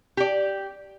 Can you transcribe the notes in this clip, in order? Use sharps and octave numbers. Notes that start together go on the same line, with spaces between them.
G4 D5